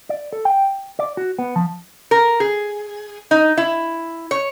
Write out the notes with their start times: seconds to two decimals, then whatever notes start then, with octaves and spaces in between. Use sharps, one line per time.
0.09 D5
0.33 A4
0.45 G5
0.99 D5
1.17 F#4
1.39 B3
1.56 F3
2.11 A#4
2.40 G#4
3.31 D#4
3.57 E4
4.31 C#5